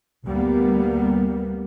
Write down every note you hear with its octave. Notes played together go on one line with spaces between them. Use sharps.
D2 G3 A#3 B3